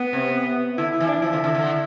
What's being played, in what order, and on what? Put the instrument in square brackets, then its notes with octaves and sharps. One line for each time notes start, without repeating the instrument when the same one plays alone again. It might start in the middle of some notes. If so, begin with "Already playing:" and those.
Already playing: [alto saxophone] B3
[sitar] C3
[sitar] D3 [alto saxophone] E4
[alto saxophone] E4
[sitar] E3
[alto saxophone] D4
[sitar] F3 [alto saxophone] E4
[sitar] D3
D3
D3